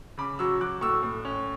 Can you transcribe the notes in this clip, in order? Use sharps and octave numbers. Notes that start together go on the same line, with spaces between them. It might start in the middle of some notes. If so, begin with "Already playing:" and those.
C#3 B5 D6
F#3 C#6 E6
F#3 D6 F#6
A2 C#6 E6
A2
C#4